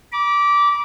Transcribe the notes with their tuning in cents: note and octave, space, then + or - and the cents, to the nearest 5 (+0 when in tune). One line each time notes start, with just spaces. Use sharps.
B5 -45 D6 -15